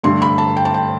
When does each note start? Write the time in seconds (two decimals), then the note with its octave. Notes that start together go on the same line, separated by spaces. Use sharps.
0.03 G2 D3 A3 C6
0.22 B5
0.38 A5
0.57 G5
0.65 A5
0.74 G5